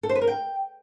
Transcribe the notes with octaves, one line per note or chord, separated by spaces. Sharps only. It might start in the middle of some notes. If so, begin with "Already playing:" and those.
A4
C5
B4
A#4
G5